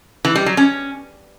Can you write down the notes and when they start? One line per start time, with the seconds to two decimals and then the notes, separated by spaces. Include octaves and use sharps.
0.25 E3
0.35 G3
0.46 F#3
0.57 C#4